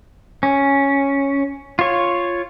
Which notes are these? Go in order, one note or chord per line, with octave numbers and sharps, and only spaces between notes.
C#4
F4 C#5